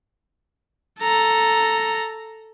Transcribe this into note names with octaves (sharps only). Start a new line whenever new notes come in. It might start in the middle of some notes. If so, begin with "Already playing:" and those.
A4 A#5